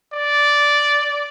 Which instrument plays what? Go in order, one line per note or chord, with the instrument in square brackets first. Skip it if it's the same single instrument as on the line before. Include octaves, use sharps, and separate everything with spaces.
[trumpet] D5